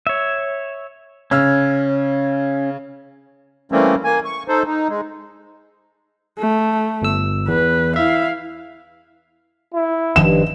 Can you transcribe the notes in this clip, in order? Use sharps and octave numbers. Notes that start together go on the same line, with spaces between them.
C#5 E5
C#3 C#4 E6 F6
E3 G3 A3 A#3 C4 C#4
A#3 G#5
C#6
D#4 A4 C5
D#4
G#3
A3
G1 E6
E2 B4
E4 E5 F5
E4
F1 G2 D#3 F3 E7